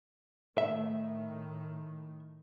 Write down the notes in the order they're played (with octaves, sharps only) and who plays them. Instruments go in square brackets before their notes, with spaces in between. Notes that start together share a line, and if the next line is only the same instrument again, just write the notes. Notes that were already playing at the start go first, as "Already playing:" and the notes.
[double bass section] A2 D#3 A3 [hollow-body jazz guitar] E5